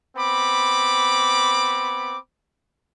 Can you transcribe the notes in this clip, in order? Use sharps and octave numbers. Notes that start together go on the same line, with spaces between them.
B3 C4 B5 D6